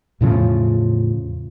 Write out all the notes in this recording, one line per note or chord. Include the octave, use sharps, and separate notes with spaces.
E2 A2 C#3 F3